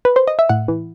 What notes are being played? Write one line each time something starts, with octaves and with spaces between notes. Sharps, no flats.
B4
C5
D#5
E5
A2 F#5
E3